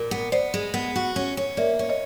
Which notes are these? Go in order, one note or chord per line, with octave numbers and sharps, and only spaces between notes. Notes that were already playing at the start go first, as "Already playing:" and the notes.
Already playing: A#2
B3
B3 C5 D5
G#3
B3
F#4
C#4
C#4
A#3 D5 E5
C#4
C#5 D#5